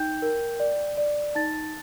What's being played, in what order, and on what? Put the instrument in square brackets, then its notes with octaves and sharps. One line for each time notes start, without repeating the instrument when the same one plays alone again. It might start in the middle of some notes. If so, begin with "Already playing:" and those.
Already playing: [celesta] D#4 G5 G6
A#4
D5
D5
D#4 A5 A6